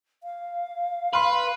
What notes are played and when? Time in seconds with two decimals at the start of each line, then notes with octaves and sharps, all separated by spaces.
0.23 F5
1.13 B4 C6 F6